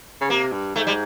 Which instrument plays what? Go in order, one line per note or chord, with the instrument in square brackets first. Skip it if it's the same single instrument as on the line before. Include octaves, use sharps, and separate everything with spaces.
[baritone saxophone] C#3
[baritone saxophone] C3 [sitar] A#3
[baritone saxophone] G2
[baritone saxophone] G#2 [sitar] A3
[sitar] G3